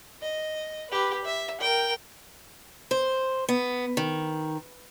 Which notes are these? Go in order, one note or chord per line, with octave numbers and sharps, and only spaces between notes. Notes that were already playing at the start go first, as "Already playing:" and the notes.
D#5
G4 B4
E5
A#4 G5
C5
B3
D#3